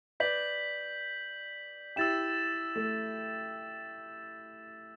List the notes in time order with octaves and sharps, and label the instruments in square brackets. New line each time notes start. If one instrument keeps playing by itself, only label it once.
[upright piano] B4 D5 [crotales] G6 B6 F#7
[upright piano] E4 G4 [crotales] E6 A6 E7
[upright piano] A3